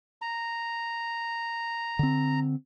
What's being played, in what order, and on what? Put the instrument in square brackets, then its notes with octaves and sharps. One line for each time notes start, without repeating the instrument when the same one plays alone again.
[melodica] A#5
[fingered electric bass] D3 C4